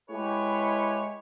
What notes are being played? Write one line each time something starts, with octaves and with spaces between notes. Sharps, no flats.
G#3 E4 G4 B4 C#5